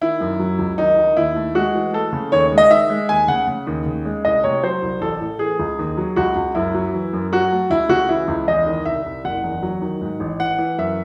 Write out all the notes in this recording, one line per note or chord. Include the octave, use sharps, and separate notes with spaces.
D#3 E4
F#2
F#3
C#2
D#3 D#4
D#3
D#2 E4
A3
G#3 F#4
E3
A3 A4
C#3
D#2 C#5
G#3
D#5
D#3 E5
G#3
D#2 G#5
C#3 F#5
C#3
D#2
C#3
G#3
C2 D#5
C3 C#5
F#3 C5
C2
A1 A4
A2
E3 G#4
C#2
D#2
F#3
C#2 F#4
C#2
F#2 E4
F#3
E3
F#2
F#3 F#4
A3
C#2 E4
C#3 F#4
E3 E4
C#2
E2 D#5
D#3
C2 E5
C2
F#1 F#5
E2
F#3
D#3
G#2
A1
E3 F#5
E3
F#2 E5